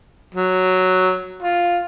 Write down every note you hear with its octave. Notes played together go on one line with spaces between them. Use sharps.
F#3
F4